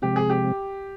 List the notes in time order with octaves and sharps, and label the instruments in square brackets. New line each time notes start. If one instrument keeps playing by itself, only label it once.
[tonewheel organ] C3 F3 G#3 C4 [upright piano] G4
[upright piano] G#4
G4